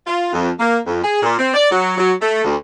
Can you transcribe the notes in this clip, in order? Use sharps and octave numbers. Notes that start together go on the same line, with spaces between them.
F4
F2
A#3
F2
G#4
A#2
C4
D5
F#3
F#3
A3
D2